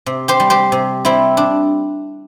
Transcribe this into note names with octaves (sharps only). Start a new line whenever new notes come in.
C3
G4 C5
G3
G4 C5
C3
G3 C4 E4
D4